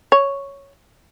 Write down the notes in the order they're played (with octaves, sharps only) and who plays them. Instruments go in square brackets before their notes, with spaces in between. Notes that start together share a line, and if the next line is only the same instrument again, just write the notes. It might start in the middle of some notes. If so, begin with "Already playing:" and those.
[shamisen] C#5